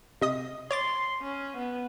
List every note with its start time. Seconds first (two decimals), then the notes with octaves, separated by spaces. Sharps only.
0.21 C3 D#5 D#6
0.71 C#5 C6 D6 A6
1.22 C#4
1.57 B3